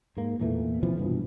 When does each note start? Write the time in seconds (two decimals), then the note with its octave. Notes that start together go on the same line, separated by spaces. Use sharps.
0.17 G#2 A#3
0.40 E2 A#2 E3 A3
0.83 C3 E3 F3 B3
0.99 G2 B2